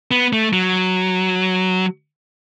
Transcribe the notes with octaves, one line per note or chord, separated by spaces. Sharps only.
B3
A3
F#3